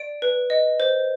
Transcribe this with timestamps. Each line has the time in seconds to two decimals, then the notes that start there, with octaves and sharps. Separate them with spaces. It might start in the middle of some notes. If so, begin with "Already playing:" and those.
Already playing: D5 D7
0.22 B4
0.50 D#5
0.80 C5